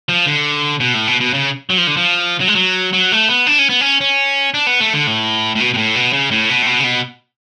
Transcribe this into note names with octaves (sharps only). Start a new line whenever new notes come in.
F3
D3
B2
A2
B2
B2
C#3
F#3
F3
D3
F3
F#3
G#3
F#3
F#3
A3
B3
D4
C#4
B3
C#4
C#4
D4
B3
A3
D3
A2
A2
B2
B2
A2
B2
C#3
A2
B2
A2
B2
C#3
B2